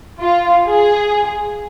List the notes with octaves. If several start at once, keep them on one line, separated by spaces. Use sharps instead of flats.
F4
G#4